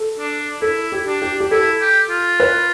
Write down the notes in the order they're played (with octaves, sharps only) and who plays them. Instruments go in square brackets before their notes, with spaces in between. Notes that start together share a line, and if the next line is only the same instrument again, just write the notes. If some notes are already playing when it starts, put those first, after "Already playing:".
Already playing: [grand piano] A4
[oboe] D4
[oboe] E4 [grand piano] A4
[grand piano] G4
[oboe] D4
[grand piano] G4
G4
[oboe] E4 [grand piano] A4
[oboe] G4
F4
[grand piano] B4